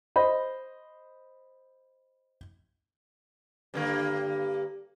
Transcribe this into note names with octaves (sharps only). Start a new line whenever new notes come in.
C5 D#5 B5
G2 D3 A#3